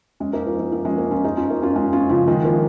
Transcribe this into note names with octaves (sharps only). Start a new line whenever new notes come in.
G#3 C#4
A#3 D#4
F3 A#3
F3 A#3
F3 A#3
G#3 C#4
A#3 D#4
C#4 F4
D#4 G#4
C#4 F4
A#3 D#4
C#4 F4
G#3 C#4
C#4 F4
C#3 F3
D#3 G#3
F3 A#3